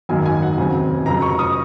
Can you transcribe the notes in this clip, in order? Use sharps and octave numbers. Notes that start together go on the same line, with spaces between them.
G#1 F#2 D#3 F#3 A#3 G#5
G#5
F#5
F1 D#2 C#3 F#3 C4 G#5
F1 F2 C#3 F#3 A#5
C#6
D#6